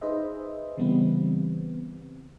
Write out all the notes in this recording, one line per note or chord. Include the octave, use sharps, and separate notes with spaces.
D#4 G#4 B4 C5 D#5 E5
C#3 E3 G3 B3 C4 B4